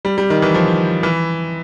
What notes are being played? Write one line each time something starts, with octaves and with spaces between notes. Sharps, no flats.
G3
G3
D#3
E3
F3
E3